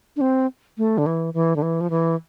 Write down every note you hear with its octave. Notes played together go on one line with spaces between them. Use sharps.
D4
C4
A3
D3
E3
E3
D3
E3
F3
E3